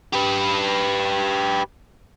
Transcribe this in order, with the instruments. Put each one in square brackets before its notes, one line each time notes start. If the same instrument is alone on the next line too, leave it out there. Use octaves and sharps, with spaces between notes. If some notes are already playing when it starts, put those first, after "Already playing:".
[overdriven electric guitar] G4 B4